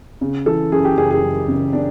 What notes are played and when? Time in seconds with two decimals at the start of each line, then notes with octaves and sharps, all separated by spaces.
0.21 C#3
0.46 E3 A4
0.72 F#2 G#4
0.85 G4
0.97 F#1 G#4
1.11 G#4
1.23 F#2
1.48 C#3
1.73 C#3 D4